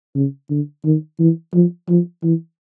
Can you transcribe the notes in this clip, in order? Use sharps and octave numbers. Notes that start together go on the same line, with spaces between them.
C#3
D3
D#3
E3
F3
F3
E3